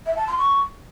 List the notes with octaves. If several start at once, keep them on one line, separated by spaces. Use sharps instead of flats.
E5
A5
C6
C#6